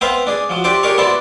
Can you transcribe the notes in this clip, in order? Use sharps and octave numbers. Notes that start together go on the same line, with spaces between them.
B3 C4 B4 C5 E5 F5
D4 G#4
F3 F#3
D4 G4 C5 D5 E5
D4 G4 G#4 A#4 C#5 C#6
B3 E4 F#4 C5 D5 A5